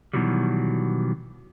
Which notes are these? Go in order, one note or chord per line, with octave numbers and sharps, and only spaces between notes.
B2 D#3 E3 F#3 G3